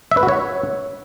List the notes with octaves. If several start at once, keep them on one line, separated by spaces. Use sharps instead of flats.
E5
B4
F#4
C#5